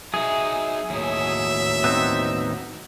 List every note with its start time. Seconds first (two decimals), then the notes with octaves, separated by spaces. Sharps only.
0.14 F#3 D#4 G#4 E5
0.90 D#2 A2 E3 F#3 E5
1.84 B3 C4 D#4